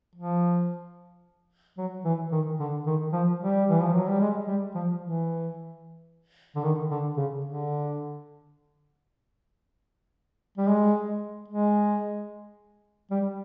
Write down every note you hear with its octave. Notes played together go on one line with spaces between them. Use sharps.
F3
F#3
E3
D#3
D3
D#3
F3
G3
E3
F3
F#3
G3
G#3
G3
F3
E3
D3
D#3
D3
C#3
D3
G3
G#3
G#3
G3